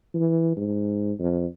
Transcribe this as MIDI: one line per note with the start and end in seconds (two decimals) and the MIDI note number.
0.14 0.55 52
0.57 1.12 44
1.19 1.46 41